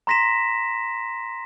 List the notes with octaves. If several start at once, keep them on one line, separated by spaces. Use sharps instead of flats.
A#5 C6 A#6 B6 E7